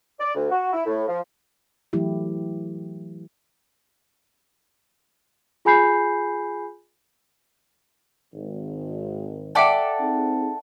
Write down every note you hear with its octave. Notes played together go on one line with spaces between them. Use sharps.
D5
D2
F#4
E4
A2
F3
E3 F#3 A3 E4 G4
F4 G#4 G#5 B5 G6 C7
G#1
A4 D5 E5 F#5 G5 D6
C4 D#4 G#4